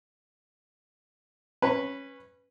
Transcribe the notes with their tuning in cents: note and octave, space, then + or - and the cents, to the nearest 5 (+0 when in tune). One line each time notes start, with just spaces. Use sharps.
C#4 -15 B4 +0